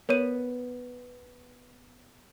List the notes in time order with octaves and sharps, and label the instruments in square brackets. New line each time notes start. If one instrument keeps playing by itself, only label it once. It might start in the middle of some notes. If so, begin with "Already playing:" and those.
[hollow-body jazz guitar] B3 [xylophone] A#4 C#5 D#7